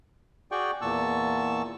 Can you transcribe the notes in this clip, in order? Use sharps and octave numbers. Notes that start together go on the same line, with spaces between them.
F#4 G#4 D5 G5 C#6
E2 A#2 A5 C#6 E6